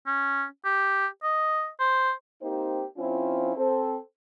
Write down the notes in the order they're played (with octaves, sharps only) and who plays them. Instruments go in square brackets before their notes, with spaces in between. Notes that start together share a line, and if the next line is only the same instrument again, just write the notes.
[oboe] C#4
G4
D#5
C5
[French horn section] A#3 C4 D#4 G4 C5
F3 C4 C#4 E4 F4
C4 A4 C5